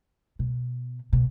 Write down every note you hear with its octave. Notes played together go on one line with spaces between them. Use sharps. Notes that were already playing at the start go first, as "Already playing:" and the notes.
B2
B2